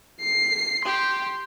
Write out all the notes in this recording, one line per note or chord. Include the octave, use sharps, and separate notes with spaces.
C7
G4 C6